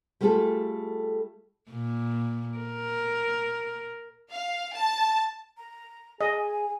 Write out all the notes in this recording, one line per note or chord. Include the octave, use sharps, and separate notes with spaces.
G3 A3 F4 G#4 A4
A#2
A#4
F5
A5
A#5
G#4 D#5 G#5